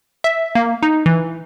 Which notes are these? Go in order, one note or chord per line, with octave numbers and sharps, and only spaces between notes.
E5
A#3
D#4
E3